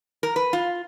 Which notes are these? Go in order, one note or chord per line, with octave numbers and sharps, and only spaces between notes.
A#4
B4
F4